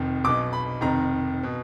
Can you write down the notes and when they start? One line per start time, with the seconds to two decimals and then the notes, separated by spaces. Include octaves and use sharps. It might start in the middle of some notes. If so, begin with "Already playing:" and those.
Already playing: F1 F2 D#3
0.24 B1 B2 D6
0.53 B5
0.81 F1 F2 D#3 A#5
1.43 B2